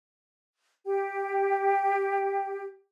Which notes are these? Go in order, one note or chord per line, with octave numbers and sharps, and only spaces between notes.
G4 G5